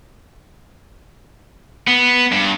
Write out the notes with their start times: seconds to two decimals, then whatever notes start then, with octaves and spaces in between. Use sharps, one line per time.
1.87 B3
2.32 G2